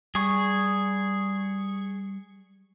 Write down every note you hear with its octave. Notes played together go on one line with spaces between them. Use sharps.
G3 G#4 C#6